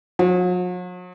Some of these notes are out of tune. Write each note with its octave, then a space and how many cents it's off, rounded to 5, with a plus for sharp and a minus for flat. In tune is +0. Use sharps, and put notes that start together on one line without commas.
F#3 -45